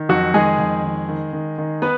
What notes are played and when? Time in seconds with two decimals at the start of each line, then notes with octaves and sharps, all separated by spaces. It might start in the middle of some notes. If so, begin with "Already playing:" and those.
Already playing: D#3
0.09 F2 F#3 F#4
0.34 D#3 G#3 G#4
0.59 F2
0.83 D#3
1.09 D#3
1.33 D#3
1.58 D#3
1.82 B3 B4